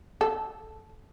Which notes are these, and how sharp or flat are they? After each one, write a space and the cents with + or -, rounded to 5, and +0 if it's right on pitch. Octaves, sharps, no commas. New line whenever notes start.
A4 -15